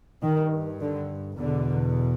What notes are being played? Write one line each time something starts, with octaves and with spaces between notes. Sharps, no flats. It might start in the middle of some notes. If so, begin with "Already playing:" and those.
G2 D#3
D3
E2 B2 D3